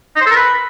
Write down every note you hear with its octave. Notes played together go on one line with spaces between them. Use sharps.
D#4
C5
A4
A#4
B4